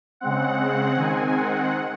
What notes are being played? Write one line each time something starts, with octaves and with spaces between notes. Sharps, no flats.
C#3 G#3 C4 F#5
F#5
D#3 G#3 C4 G#5
F#5